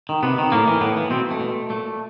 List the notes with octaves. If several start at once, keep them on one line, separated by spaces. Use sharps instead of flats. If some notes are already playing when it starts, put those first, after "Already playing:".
D#3
C3 B3
D#3
A2 A#3
E3
A2 B3
E3
B2 C4
A3
B2
A#2 A3